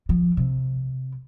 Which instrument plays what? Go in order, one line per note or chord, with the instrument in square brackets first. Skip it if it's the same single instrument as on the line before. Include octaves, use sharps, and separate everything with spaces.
[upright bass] F3
C3